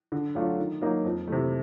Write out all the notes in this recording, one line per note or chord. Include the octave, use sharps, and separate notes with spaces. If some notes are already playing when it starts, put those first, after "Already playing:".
D3
F#3 A3 D4 F4
D#3
F#3 A#3 D#4
F2
C3 E3 A3